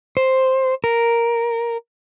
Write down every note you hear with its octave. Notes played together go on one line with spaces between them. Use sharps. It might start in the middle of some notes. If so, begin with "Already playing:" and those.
C5
A#4